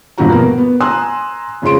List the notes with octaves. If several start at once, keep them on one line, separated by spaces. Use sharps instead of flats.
E1 G2 C3 F3 F#4 A#5
A#3 B3 A#4
B3
G#5 A#5 C6 D#6 E6 F#6
F2 C#3 F3 G#3 C6 D7